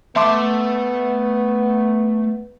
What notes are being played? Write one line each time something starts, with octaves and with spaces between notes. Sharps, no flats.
A3 B3 E5 A5 C6 D6